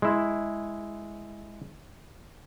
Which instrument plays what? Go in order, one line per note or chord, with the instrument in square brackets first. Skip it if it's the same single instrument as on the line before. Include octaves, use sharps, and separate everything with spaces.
[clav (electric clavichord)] G#3 E4